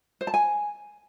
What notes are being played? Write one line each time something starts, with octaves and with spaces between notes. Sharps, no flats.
C5
A5
G#5